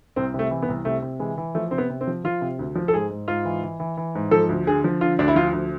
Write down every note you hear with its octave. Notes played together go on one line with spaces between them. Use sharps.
C2 C4
C3 A3
E3
B3
C2
C3 A3
C3
E3 G#3
E3
F3 A3
C3 C4
B3
C3
C4
F3
F3 F4
C3
D2
F3
A4
G#2 G#4
G#2
G#2 F4
E3
E3
E3
E3
G#2
F3 A4
D2
D3 G#4
F3
D3 F4
D2 D4
E4
F3 F4
D2